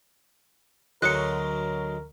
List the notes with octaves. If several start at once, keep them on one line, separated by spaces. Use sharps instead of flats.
D2 F#3 G#3 A#4 F#6 C#7